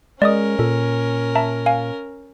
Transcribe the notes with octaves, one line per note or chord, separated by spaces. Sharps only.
G#3 C#4 A#4 D5 D#5 D#6
A#2 A4
E5 A5 A#5
F5 G#5